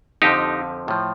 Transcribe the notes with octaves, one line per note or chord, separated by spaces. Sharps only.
F2 D3 F3 D#4 G4
A2 F3